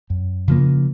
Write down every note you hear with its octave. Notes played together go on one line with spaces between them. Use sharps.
F#2
C#3 F3 A#3